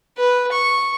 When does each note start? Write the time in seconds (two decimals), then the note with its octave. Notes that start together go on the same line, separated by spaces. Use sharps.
0.18 B4
0.52 C#6